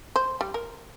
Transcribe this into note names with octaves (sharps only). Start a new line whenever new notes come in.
C5
G3
A#4